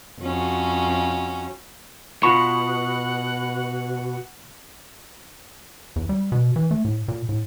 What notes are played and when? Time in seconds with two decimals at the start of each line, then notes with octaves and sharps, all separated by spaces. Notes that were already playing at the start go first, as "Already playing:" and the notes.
0.21 F2 C#4 F#4
2.23 B2 F4 F#5 A5 B5 C#6
5.96 E2
6.09 G3
6.32 B2
6.56 E3
6.71 A3
6.85 A2
7.08 A#2
7.29 A2